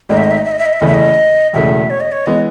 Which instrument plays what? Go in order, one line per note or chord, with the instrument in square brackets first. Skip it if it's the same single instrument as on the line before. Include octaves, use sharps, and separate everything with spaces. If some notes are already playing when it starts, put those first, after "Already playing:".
[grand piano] G#1 G#2 D#3 A3 [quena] D#5
[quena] E5
D#5
E5
D#5
E5
D#5
E5
D#5
E5
[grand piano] F#1 E2 C#3 E3 A3 [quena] D#5
[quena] E5
D#5
[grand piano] E1 E2 C#3 E3 A3 [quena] E5
[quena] C#5
D#5
C#5
[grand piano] E3 G#3 B3 [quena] D#5